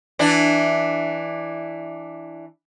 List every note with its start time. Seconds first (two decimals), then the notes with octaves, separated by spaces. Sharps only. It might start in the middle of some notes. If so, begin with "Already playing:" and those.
0.19 E3 D4